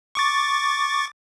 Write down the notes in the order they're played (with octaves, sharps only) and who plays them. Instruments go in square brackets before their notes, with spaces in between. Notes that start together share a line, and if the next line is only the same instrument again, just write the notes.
[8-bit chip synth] C#6 D6 A6